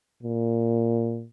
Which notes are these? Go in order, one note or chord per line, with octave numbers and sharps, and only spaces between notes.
A#2